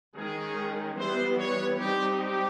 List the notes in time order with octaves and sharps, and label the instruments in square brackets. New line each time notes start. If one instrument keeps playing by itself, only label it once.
[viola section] D#3 G#3 C#4 [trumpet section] G#4
[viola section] E3 G3 B3 [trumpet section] C5
[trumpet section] C#5
[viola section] G3 C4 D#4 [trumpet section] G4
[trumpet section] G4